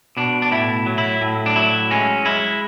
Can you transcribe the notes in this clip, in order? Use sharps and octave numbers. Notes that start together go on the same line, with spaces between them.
B2 D4
D4
A2 E4
F#3
E4
A2
D4
F#3 E4
G#3 C#4
G#3 E4